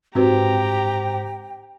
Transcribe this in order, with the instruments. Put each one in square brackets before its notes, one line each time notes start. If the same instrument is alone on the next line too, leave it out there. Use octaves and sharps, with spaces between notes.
[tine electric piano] G#2 C5 [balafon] C4 F#4 B4 [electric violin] G4 A#5 [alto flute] G5